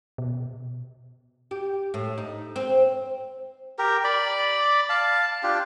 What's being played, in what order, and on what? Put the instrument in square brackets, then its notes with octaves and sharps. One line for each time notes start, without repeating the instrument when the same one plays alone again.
[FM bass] B2
[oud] G4
A2
D#4
C4
[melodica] G4 A#4
D5 B5
F5 A5
D4 F4 G4